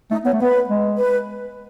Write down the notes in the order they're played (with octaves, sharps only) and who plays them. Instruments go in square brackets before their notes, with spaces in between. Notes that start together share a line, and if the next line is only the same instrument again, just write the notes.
[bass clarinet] A3 [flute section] D#4
[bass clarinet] B3 [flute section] C#5
[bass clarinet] A3
[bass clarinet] B3 [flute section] B4
[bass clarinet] G#3
[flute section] B4